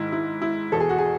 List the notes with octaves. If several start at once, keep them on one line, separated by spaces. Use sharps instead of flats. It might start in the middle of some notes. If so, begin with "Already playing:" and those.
Already playing: G#2 D#3 E4
E4
E4
E2 B2 A4
G#4
F#4
G#4